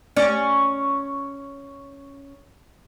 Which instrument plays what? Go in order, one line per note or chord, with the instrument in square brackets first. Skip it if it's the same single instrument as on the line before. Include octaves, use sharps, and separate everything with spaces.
[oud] C#4 D5